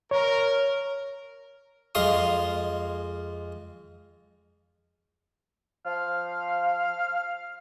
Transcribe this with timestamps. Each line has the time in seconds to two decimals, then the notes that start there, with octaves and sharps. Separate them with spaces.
0.11 A#4 C#5
1.95 F2 G#3 F5 C6 D#6
5.86 F3 F5